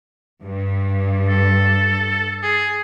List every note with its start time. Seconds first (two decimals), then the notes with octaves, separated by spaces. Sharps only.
0.43 G2
1.29 A4
2.43 G#4